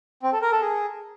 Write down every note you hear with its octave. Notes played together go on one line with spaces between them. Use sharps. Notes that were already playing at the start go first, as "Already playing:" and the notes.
C4
A4
A#4
A4
G#4